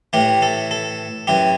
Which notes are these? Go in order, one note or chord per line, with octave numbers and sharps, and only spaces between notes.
A2 E3 G4
A4
A4
F#2 E3 G4